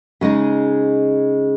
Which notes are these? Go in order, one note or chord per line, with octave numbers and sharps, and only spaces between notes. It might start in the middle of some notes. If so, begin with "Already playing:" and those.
C#3 G#3 D#4